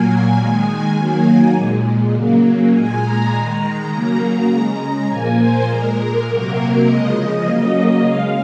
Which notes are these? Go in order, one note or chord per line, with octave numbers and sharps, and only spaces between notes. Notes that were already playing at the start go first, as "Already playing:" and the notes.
Already playing: A#2 F#3 A#3 G#5
D#3 G#3 G#5
D#3 F#3 A#3 G#5
A#2 G#3
C#3 F#3 A#3
A#2 G#3 G#5
A#5
D#3 G#3
C#3 F#3 A#3 A#5
C#3 G#3
A#2 F3 A#3 G#5
C5
A#2 G#3 A#4
C3 F#3 A#3
C#3 F3 G#3 D#5
C#3 F#3 A#3
C#3 G#3 F5